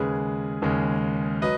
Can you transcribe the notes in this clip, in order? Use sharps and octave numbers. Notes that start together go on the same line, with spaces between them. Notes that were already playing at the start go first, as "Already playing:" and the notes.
Already playing: D#2 C#3 G#3 G#4 B4
D#2 C#3 G#3
F#3 B4 D#5